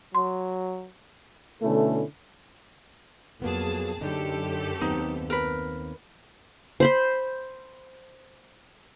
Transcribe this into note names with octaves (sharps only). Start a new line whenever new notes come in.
F#3 C6
B2 D3 A3 C#4 E4 A4
F2 F#3 A#3 B3 G#4 A5
F#2 D3 D#4 G4 A4
D#2 B3 C4 D#4
A#4 B4
C5 B5 C6